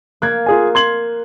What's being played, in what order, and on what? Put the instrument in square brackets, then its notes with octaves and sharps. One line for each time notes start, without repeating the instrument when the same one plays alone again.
[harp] A#3 [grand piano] F#6 G#6
[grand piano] F4 G#4 G#5
C6 G#6 F#7